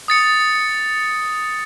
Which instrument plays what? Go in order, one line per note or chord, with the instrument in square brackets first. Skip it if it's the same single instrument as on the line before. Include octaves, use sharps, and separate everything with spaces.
[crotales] D#6 A6 C#7